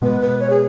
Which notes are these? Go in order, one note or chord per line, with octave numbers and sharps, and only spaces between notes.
B2 G#3 B3 B4
B4
C#5
G#4